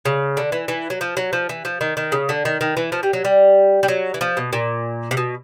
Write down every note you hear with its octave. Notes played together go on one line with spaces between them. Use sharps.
C#3
D3
E3
E3
F#3
F3
F#3
F3
E3
F3
D#3
D#3
C#3
D3
D#3
D#3
E3
F3
G3
F#3
G3
G3
F#3
E3
F3
B2
A#2
C3
B2